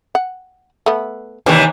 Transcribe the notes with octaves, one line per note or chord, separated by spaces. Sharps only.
F#5
A3 B3
D#2 C3 E3 G3 D4 C#5